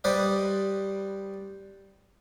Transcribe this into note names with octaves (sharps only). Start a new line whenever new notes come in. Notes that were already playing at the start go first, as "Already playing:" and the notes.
G3 B4 C5 D5 D#5